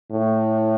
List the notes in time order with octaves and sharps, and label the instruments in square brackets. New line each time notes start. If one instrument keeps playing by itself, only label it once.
[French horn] A2